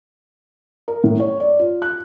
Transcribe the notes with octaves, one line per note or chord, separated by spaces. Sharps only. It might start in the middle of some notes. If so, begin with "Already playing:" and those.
A#4
A2
C#5
D5
F4
F#6